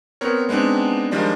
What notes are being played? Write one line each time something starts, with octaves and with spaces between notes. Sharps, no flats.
B3 C4 A#4 C#5
G#3 B3 C4 D4 D#4
D#3 F3 G3 G#3 D4